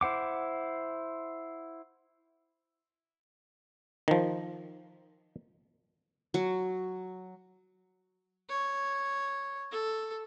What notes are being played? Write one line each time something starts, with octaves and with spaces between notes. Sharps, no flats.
E4 C5 F#5 D6
D#3 F3
F#3
C#5
A4